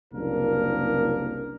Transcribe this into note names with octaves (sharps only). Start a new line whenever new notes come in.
F#1 C2 A#3 D4 A#4